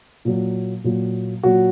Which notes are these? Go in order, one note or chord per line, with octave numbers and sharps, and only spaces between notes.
A#2 F#3
A#2 F#3
A#2 F#3 F#4